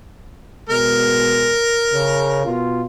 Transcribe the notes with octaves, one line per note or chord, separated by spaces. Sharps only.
B2 G#3 A#4
C#3
B2 F4